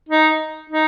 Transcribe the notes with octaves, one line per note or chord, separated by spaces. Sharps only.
D#4
D#4